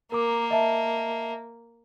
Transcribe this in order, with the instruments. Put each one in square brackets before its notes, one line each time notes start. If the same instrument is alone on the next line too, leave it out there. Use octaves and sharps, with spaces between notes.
[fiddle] A#3 [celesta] A#4 A#5 D6
[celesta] D#5 E5 A5